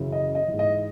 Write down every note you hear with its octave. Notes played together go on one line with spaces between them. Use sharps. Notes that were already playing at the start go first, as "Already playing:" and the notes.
Already playing: F#2 C#3 E3
D#5
D#5
G#2 E3
D#5